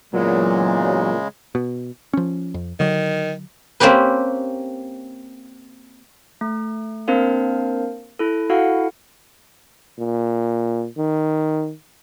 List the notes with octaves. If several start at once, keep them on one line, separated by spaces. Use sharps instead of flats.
E2 A#2 C#3 F#3 G#3
B2
F3 C#4
F2
D3 D#3 F#3
A#3 C4 C#4 G4 B4
A3
A#3 C4 D4 A#4 C5 F5
E4 A4
E4 F#4 A4 F5 F#5
A#2
D#3